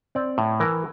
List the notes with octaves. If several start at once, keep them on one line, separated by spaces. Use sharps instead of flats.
C4 D5
A2
E3 A#4